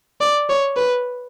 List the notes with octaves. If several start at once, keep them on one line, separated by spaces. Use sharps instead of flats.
D5
C#5
B4